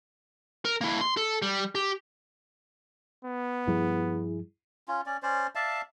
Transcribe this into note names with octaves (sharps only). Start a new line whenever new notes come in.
A#4
A#3 E4
C6
A4
G3
G4
B3
G2 F3 G3 E4 G#4
C#4 F4
C#4 D5
C#4 C5 D5
D5 E5 F5 A5